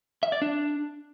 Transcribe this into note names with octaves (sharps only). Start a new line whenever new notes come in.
E5
D5
D4